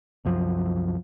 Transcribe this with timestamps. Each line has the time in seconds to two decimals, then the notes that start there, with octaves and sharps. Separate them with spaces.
0.25 C2 F#2 F3